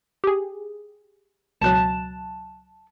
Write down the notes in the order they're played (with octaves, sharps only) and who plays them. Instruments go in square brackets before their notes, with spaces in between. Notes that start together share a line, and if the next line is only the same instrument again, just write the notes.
[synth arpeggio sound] G4 G#4
[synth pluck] C#2 B2 F#3 [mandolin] A5 F#6